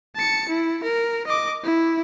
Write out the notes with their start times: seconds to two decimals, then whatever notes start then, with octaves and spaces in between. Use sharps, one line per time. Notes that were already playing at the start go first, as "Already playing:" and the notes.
0.15 A5 C#7
0.49 E4
0.83 A#4
1.27 D#5 D6
1.63 E4